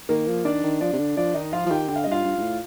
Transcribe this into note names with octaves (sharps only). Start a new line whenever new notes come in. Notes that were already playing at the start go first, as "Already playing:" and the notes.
D#3 A#3 A#4
F3
D#3 D4 D5
D#3
F3 D4 D5
C3
D3
F3 D4 D5
D#3 D#4 D#5
F3 F4 F5
F3
D#3 G4 G5
D3 G5
F5
D#5
G2 F4 F5
G2
G2
A2